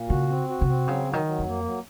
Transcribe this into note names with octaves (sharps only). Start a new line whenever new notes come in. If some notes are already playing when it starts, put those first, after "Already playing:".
Already playing: A#2
C#3 F#4
C4
F#4
C3
C4
C#3 F#3
F#3
D#3
F#3
F2
A#3
F#3